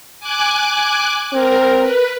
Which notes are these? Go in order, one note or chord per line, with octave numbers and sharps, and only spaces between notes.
G#5 D6 F#6
C4 A#4
B4